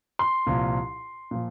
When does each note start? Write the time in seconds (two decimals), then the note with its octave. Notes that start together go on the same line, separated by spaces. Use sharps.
0.19 C6
0.46 C2 A#2 F3
1.31 A#2 F3